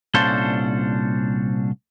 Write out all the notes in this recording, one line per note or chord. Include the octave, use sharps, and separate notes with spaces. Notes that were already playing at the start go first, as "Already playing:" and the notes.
C2 A#2 C#4 D4 A4 C5